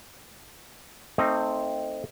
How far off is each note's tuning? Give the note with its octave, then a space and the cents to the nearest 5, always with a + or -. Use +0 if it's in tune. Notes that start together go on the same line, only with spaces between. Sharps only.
A3 +25 C4 +0 D#4 +0